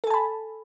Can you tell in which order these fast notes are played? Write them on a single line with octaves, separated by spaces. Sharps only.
A4 G#5 A5 B5